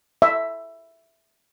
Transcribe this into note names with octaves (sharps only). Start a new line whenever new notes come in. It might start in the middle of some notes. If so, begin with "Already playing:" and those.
E5